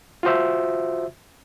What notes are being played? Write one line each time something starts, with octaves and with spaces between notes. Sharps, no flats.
F4 F#4 C5 E5